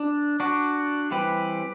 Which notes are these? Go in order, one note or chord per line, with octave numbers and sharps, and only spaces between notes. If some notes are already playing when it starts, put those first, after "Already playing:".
Already playing: D4
D4 F#4
E3 G3 C4 G4 B4